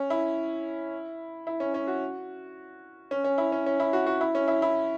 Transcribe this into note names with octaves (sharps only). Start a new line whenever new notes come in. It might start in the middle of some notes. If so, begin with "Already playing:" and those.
Already playing: C#4
E4
E4
C#4
C#4
F#4
C#4
C#4
E4
C#4
C#4
E4
F#4
F#4
E4
C#4
E4
E4